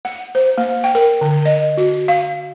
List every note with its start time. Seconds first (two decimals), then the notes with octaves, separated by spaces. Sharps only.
0.05 F#5
0.35 C5
0.58 A#3
0.84 G5
0.95 A#4
1.21 D3
1.45 D#5
1.77 F#4
2.08 F5